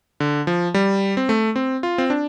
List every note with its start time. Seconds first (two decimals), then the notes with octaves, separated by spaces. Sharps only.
0.20 D3
0.47 F3
0.74 G3
1.17 C4
1.29 A3
1.56 C4
1.83 F4
1.98 C4
2.10 D4